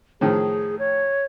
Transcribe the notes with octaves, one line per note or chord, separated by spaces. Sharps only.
A2 D#3 F3 G#4
C#5